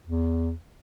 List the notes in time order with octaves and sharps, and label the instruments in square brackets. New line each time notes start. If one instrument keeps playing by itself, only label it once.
[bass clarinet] E2